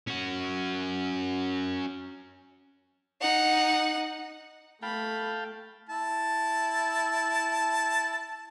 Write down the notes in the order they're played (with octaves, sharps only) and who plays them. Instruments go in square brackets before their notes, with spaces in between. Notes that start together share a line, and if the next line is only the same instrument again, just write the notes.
[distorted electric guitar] C#4 F#4
[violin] D#4 F#5
[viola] A3 [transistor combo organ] F5 G5 A5 [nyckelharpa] B5
[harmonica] E4 A5